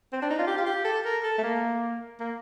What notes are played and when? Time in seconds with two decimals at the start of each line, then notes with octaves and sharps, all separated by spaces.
0.13 C4
0.22 D4
0.30 D#4
0.38 F4
0.47 G4
0.58 F4
0.66 G4
0.84 A4
1.05 A#4
1.23 A4
1.38 A3
1.43 A#3
2.20 A#3